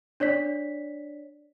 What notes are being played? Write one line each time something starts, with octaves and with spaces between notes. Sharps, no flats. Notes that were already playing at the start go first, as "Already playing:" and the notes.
D4 C#5 D5 B6